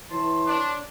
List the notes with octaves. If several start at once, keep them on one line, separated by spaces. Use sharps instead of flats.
E3 C#5 A5 C6
D4